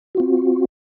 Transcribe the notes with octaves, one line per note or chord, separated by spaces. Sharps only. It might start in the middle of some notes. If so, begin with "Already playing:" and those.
C4 F4 F#4